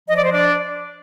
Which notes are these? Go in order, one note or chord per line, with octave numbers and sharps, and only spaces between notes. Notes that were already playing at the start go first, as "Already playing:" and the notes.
F3 D#5
D5
C5
D4 D5